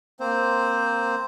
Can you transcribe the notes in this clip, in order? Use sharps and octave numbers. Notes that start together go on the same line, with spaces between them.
A#3 C4 C5